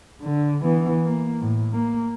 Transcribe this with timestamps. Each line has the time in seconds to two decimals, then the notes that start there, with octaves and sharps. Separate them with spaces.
0.22 D3
0.62 E3 B3
1.06 A#3
1.40 A2
1.73 A#3